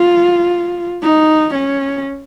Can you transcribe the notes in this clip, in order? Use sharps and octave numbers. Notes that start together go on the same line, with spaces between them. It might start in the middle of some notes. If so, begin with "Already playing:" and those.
Already playing: F4
D#4
C#4